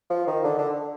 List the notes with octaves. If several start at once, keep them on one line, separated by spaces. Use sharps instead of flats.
F3
D#3
D3
D3